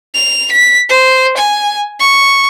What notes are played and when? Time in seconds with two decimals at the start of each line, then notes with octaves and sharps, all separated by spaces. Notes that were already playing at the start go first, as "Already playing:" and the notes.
0.14 F7
0.51 B6
0.89 C5
1.37 G#5
2.00 C#6